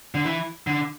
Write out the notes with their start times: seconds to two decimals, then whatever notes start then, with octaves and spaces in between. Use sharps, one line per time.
0.15 D3
0.25 E3
0.67 D3